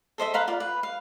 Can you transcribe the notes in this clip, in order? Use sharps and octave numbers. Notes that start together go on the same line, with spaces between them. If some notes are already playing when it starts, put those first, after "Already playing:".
A4 C5 D#5 E5
B4 F5 A#5 C6
F4 D5
B4
F5